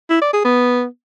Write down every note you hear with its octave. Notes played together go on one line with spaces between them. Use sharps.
E4
D5
G#4
B3